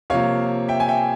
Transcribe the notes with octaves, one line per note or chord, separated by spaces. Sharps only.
C3 F3 A#3 C#5 F5
E5 G5
G#5
E5 G5